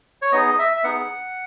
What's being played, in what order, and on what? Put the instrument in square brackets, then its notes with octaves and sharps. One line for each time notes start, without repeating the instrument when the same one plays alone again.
[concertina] C#5
B3 D#4 G#4 D#5
E5
E5
B3 D#4 G#4 F#5